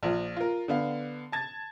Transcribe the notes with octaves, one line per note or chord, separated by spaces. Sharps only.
A#1 F3
F4 A#4
D3 B3 F5
A5 G#6 A6